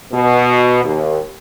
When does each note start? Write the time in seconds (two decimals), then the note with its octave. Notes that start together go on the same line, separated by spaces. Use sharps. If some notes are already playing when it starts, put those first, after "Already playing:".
0.13 B2
0.84 D#2